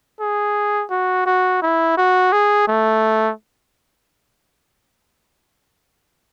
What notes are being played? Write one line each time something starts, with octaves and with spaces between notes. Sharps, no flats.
G#4
F#4
F#4
E4
F#4
G#4
A3